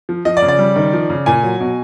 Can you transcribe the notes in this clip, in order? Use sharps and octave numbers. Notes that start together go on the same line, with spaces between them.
F3
F3 D#5
D5
C#3
D5
G3
D#3
F3
C#3
A#2 G#5
F#3
B2